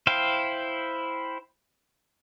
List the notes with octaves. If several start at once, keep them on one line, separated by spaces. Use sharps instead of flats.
E4 C5 F5 G5